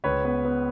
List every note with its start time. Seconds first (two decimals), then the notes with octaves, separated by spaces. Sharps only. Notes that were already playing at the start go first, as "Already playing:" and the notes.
0.04 C#2 B4 C#5
0.24 B3
0.45 B3